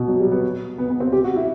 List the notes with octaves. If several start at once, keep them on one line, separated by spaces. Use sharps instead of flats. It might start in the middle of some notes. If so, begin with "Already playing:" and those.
Already playing: B2
F#3
G3
B3
B3
B3
C4
G4
F#4
E4